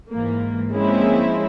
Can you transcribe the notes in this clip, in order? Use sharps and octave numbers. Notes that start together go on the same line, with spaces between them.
G#2 E3 A#3
F3 G#3 A#3 C4 C#4 E4